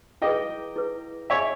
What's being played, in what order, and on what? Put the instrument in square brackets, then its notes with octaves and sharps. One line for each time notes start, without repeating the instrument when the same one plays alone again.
[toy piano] E4 G#4 B4 [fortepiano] D#5 G5
[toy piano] E4 G#4 B4
[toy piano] G#4 D#5 G#5 [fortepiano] C#5 E5